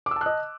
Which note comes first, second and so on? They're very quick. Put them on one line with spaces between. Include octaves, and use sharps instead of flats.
D6 E6 A5 F#6 D#5